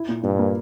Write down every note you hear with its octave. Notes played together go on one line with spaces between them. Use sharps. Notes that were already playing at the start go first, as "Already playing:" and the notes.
Already playing: E4
A#2
G2 A#2
A#3